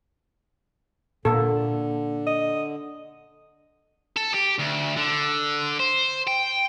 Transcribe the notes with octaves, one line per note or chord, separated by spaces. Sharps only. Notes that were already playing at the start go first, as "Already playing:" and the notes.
A#2 D3 A#3 A4
D#5
A4
G4
D2
D3
C5
G5